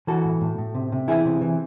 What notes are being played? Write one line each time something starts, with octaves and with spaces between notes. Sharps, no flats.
E3 F#4 A4
A2
A2
A2
C3
C3
E3 E4 G#4
C3
E3